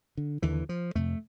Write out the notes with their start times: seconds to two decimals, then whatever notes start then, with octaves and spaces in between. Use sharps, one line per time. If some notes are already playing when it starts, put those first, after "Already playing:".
0.17 D3
0.42 D#2 D3 E3
0.69 F3
0.95 F2 C3 A3